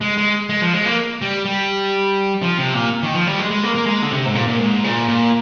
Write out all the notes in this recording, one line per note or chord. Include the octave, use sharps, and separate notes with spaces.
G#3
G#3
G#3
F3
G#3
A#3
G3
G3
F3
C3
A#2
D#3
F3
G3
G#3
G#3
A#3
A#3
G#3
D3
C3
G#2
A#2
A#2
G#2
A#2
A#2